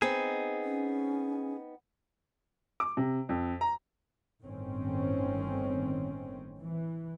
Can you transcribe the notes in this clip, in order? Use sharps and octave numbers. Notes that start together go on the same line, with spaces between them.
B3 C4 D#4 G#4
C#4
D6
C3
F2
A#5
G1 A2 D#3 C4 C#4
E3